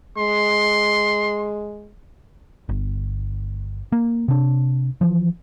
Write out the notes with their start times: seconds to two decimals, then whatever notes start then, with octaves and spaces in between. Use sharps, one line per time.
0.18 G#3 C6
2.69 G1
3.92 A#3
4.28 C3 D4
5.01 E3 F3